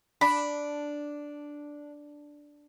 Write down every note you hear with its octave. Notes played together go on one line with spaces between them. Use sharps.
D4 B5